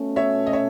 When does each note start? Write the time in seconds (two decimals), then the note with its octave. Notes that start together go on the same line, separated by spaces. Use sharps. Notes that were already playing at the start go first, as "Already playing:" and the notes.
Already playing: B2 A3 C#4
0.16 C#5 E5
0.47 D#5
0.53 C#5 E5